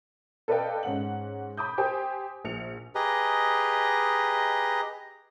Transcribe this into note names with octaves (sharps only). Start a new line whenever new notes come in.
A4 B4 D5 D#5 F5 G5
G#2 C#4 F#5 F#7
B5 D6 D#6 G6
G4 C5 G5 G#5
A#1 C#7 F7
G4 G#4 B4 D#5 A#5